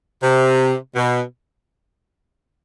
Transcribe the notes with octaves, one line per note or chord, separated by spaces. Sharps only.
C3
B2